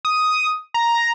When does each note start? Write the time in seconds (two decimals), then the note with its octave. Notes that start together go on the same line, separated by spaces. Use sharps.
0.05 D#6
0.74 A#5